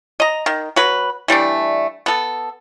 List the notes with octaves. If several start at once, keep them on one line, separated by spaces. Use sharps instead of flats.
D#5 A#5
D#3
F#3 B4
E3 G3 A3 D4
B3 A4